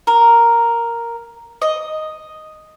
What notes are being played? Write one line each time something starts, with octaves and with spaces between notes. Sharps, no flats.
A#4
D#5